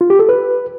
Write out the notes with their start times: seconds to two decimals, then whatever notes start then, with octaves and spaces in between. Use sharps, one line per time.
0.01 F4
0.10 G4
0.19 A4
0.29 B4